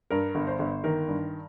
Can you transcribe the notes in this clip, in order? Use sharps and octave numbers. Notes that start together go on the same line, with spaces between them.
G2 A#4
G1
C5
G1
D#3 A#4
G2